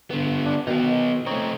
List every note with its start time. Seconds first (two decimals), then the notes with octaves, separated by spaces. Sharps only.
0.10 D3 B3
0.46 D4
0.67 B2 D#3 B3 D#4
1.26 A3 C4 D#4 C#5